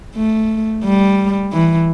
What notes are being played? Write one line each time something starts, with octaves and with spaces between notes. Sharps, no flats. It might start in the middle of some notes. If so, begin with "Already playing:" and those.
A3
G3
E3